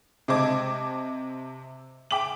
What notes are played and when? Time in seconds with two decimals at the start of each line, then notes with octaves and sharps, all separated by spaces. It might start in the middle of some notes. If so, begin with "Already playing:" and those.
0.28 C3 C4 D#5 A5 D6 G#6
2.11 G5 D6 B6 F#7